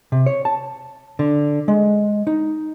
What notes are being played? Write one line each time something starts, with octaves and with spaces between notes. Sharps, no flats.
C3
C#5
A5
D3
G#3
D#4